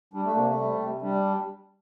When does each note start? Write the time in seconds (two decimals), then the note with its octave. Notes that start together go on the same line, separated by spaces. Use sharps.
0.14 G3 D4
0.24 A3
0.35 C3 A#3
0.47 A3
0.57 G3
0.80 C3
1.02 G3 D4